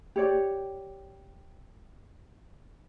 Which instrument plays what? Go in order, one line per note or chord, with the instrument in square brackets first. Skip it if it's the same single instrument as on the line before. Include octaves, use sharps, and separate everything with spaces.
[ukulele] G4 C#5 D5